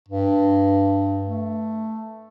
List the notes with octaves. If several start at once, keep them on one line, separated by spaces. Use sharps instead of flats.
G2
A3